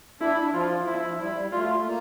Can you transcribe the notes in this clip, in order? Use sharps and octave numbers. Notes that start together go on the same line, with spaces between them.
D4 E4
E4
D4
F3 F4
F3 E4
F3
G3 E4
G3
A3 F4
A#3